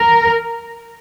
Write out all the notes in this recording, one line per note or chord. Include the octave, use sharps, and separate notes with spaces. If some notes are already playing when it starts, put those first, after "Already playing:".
Already playing: A#4